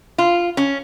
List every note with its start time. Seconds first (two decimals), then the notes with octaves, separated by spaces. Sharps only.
0.18 F4
0.57 C#4